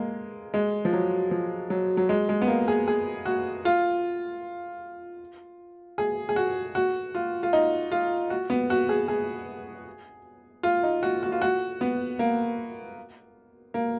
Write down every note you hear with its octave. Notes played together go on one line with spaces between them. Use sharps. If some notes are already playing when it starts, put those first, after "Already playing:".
Already playing: G#3 A#3
G#3
F3
F#3
F3
F#3
F#3
G#3
G#3
B3
A#3
G#4
G#4
F#4
F4
G#4
G#4
F#4
F#4
F4
F4
D#4
F4
F#4
B3
F#4
G#4
G#4
F4
D#4
F#4
F#4
F4
F#4
B3
A#3
A#3